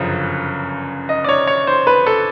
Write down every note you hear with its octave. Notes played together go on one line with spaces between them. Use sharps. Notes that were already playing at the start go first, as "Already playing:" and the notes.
Already playing: G1 F#2 C#3 F3
D#5
D5
C#5
C#5
C5
B4
A4